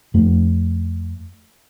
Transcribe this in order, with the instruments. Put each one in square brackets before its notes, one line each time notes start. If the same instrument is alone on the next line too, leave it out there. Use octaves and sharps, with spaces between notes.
[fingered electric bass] F2 A3